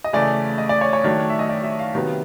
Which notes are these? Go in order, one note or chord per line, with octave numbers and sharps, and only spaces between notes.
D#5
C#3 E3 A3 D5
D#5
D5
C#5
C#5
D#3 F#3 A3 D4
E5
D#5
D5
E5
F5
C3 D#3 F#3 B3